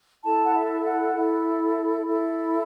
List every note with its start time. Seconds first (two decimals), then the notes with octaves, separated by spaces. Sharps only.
0.24 E4 A4 A5
0.45 F#5
0.55 E5
0.85 F#5
1.15 E4 A4
2.07 E4 A4